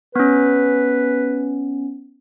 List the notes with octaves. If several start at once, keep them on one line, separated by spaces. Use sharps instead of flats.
B3 C#4 B4